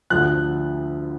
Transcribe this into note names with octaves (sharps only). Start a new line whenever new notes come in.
D2 D3 F3 F#6